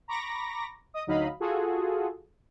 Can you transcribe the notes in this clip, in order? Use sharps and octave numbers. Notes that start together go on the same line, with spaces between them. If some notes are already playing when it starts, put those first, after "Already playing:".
A#5 B5 C#6 D6 A#6
D#5 D#6
D2 F#3 D#4 D#5 F5 B5
F4 F#4 G#4 A4